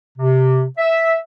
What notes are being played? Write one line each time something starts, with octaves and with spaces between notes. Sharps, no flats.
C3
E5